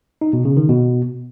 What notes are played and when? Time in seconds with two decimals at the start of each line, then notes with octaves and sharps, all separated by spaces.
0.21 D#4
0.33 B2
0.45 C#3
0.57 D#3
0.69 B2